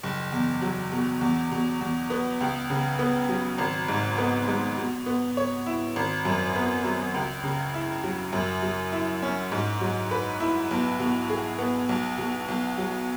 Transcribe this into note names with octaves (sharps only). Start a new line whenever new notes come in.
F#1
E2
F#3
B2
E2
B2
E2
B3
C#2
C#3
B3
F#3
G#1
G#2
B3
G#3
B2
B3
C#5
E4
G#1
F#2
B3
F#3
C#2
C#3
E4
F#3
F#2
F#3
E4
C#4
G#2
F#3
B4
E4
B1
B2
G#4
B3
B1
B2
B1
F#3